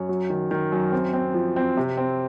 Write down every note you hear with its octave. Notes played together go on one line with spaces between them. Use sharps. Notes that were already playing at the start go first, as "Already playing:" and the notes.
Already playing: F#2 C#5
F#3
D#3
D#3
F#2
C4
C4
F3
C4
C3
C4